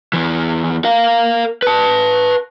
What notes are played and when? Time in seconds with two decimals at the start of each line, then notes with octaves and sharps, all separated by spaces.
0.13 E2 E3
0.84 A#4 F5
1.62 B4 A5